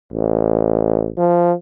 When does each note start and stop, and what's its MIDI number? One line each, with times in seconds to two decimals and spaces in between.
0.13 1.09 33
1.17 1.53 53